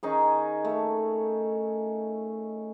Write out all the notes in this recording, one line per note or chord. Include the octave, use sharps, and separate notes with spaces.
D#3 C#4 D#4 G#4
A3